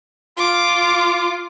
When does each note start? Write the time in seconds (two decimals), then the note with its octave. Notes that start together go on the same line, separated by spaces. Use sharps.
0.38 F4 D6